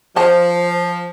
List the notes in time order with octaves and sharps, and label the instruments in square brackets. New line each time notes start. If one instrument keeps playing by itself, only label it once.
[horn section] F3 [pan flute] C5 [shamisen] D#5 A5